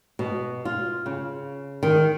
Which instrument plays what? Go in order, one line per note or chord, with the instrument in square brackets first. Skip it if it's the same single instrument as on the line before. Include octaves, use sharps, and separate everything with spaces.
[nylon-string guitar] B2
F4
C#3
D#3